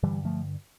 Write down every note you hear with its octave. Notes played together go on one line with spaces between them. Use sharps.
G2 D3 E3 G3
F3 A3